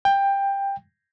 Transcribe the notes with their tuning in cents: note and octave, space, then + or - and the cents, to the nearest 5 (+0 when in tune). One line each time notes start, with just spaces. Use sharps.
G5 +15